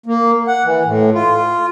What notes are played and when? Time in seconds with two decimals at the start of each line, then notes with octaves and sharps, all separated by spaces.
0.06 A#3
0.48 F#5
0.64 E3
0.86 A2
1.14 F4